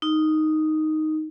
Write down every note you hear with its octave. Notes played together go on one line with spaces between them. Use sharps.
D#4